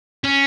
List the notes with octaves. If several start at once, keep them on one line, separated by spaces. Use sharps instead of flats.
C#4